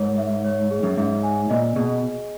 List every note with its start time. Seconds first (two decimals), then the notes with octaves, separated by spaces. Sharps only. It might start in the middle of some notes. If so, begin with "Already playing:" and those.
Already playing: G#2 D#4 A#4 C#5
0.18 E5
0.44 C#5
0.71 G#4
0.83 F#2
0.97 G#2 E5
1.23 G#5
1.50 A#2 D#5
1.76 B2 G#4